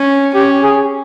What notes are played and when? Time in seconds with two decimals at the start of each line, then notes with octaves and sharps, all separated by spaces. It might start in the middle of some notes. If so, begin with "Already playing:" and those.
Already playing: C#4
0.34 C#4 G4
0.63 G#4